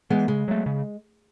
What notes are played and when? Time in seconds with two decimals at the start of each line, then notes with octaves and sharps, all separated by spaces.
0.10 E3 G#3 B3
0.28 C#3 G#3
0.48 F#3 A3
0.66 C#3